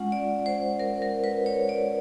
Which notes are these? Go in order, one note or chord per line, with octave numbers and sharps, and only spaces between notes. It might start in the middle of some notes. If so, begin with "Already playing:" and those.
Already playing: G#3 C#4 F4 F#5
D5
C5
A#4
A#4
B4
C#5
D5